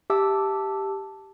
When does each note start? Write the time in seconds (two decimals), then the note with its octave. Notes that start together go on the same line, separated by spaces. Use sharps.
0.10 G4 E5 A5 D6 E6